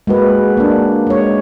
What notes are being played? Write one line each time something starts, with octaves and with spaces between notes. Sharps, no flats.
G#3 A#3 F#4 B4
A#3 D4
G#3 C#5